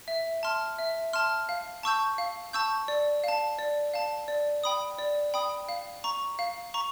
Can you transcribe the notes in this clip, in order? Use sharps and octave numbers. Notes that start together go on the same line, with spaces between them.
E5
A5 C6 F6
E5
A5 C6 F6
F5
A5 C#6 E6 G6
F5
A5 C#6 E6 G6
D5
F5 A5
D5
F5 A5
D5
G5 B5 D#6
D5
G5 B5 D#6
F5
A#5 C#6
F5
A#5 C#6